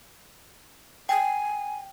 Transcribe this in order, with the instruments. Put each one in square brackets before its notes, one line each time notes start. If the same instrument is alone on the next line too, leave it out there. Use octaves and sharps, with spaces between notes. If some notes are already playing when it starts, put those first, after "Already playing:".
[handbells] G5 [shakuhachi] G#5